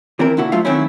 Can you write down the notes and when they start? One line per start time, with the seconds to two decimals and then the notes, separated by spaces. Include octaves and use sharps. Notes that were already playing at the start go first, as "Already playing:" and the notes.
0.19 E3 C4 E4 A#4
0.37 A#2 D3 E4 F#4
0.52 F#3 A3 F4 E5 F5
0.65 D#3 F#3 A3 C4 C#4 E4